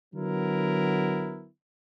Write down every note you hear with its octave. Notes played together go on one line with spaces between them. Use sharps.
D3 F#3 B3 E4 A#4